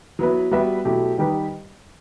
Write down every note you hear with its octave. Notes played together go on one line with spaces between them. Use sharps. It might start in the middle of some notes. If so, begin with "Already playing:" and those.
F#3 B3 E4 B4
G3 B3 F#4 B4 E5
B2 F#3 A3 E4 G4
D#3 G3 D#4 G4 B4